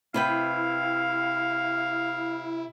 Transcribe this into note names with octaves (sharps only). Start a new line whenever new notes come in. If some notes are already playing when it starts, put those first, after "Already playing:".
C3 E4 B4 F5 G5